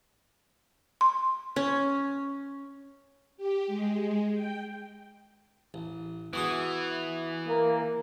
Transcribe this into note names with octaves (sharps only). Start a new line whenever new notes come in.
C6
C#4
G4
G#3
G5
A1
E3 B3 F#4 G#4
A#3